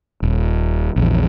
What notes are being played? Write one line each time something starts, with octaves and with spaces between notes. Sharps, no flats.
D#1
A#1 E2